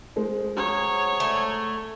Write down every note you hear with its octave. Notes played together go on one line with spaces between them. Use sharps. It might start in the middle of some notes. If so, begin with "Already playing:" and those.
G#3 C5
F#3 G#4 C#5
A3